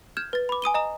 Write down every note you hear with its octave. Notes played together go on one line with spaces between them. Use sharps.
F6 G6 G#6 E7
B4 A6
B5 D6
G#5 D#6 D#7 G7
D#5 A#5 D#6